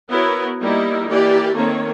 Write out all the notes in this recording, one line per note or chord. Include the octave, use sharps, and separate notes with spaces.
B3 E4 F#4 A#4 C#5
G3 A#3 D#4 E4
E3 A#3 G4 D5
D#3 A3 A#3 C4 C#5